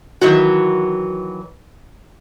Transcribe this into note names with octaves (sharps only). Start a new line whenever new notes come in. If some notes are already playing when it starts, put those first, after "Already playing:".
D#3 E3 F#3 F#4